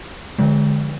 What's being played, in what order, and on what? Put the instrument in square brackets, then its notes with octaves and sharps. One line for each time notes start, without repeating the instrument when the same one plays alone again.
[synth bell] D3 F3 G#3